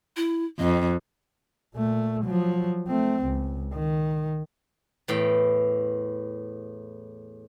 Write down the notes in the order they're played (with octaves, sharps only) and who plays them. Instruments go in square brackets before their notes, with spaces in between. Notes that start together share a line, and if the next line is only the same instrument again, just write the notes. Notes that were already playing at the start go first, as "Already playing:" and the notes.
[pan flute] E4
[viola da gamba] F2 [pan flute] D#5
[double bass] A#2 A3
F3 F#3
A3 C4
C#2
D#3
[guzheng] E2 A2 G5